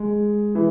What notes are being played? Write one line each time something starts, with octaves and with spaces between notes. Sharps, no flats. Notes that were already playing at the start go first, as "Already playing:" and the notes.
Already playing: G#3
E3